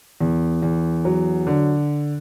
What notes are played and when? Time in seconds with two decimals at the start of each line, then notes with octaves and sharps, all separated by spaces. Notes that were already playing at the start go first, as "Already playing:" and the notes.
0.21 E2
0.62 E2
1.05 F#3
1.47 D3